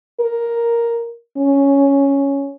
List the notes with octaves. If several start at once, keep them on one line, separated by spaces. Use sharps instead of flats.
A#4
C#4